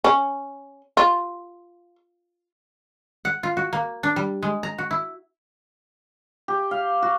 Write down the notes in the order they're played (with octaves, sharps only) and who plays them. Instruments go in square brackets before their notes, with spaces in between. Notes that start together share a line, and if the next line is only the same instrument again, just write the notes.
[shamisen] C#4
F4
[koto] F#5
F4
F#4
A#3
D4
G3
G#3
A#5
F#4
E4
[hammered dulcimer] G4
F5
F#4